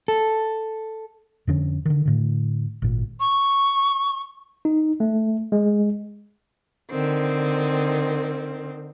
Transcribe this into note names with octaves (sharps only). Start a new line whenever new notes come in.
A4
F2 D3 C#4
D3 D#3
A2 D3
G#1 A#2
C#6
D#4
A3
G#3
D3 D#3 C4